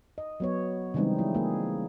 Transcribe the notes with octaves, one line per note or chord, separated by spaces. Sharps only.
D#5
F#3 B3 C#5
C#3 E3 G3 G#3 C4 D#4
F3 E4
A#3 G#4